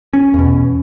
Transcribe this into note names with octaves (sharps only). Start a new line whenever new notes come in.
C#4
E2
B2